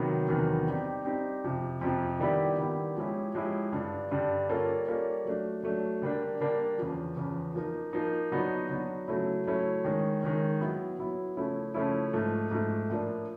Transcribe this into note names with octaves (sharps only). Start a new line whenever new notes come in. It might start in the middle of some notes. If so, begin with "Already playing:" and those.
Already playing: C3 D#3 F#3 B3
E2 C3 D#3 F#3 B3
G3 C4 D#4 G4
G3 C4 D#4 G4
F2 C3 F3
F2 C3 F3
D#3 G3 B3 E4 G4
D#3 G3 B3 E4 G4
F3 G#3 C#4 E4 G4
F3 G#3 C#4 E4 G4
G2 D3 G3
G2 D3 G3
G3 A#3 C#4 F4 A4
G3 A#3 C#4 F4 A4
F#3 A3 D4
F#3 A3 D4
D3 G3 A#3 D4
D3 G3 A#3 D4
E2 C#3 F3
E2 C#3 F3
F3 A#3 D#4
F3 A#3 D#4
D3 F#3 B3 D#4 F#4
D3 F#3 B3 D#4 F#4
C#3 F#3 A3 C#4 E4
C#3 F#3 A3 C#4 E4
D#3 G#3 C#4
D#3 G#3 C#4
F#3 B3 E4
F#3 B3 E4
C#3 F3 A3 C#4 E4
C#3 F3 A3 C#4 E4
G#2 F3 A3
G#2 F3 A3
A2 F3 A#3 D4